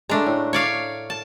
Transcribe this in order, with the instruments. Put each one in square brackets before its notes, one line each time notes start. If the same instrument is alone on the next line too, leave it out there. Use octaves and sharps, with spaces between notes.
[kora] G#3 A3 [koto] D4 A#5
[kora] A2
[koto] C#5 D5 F5
A5